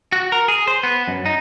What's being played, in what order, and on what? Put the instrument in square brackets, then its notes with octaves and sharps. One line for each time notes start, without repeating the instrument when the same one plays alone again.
[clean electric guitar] F#4
A#4
G#4
C5
B3
F#2
D#4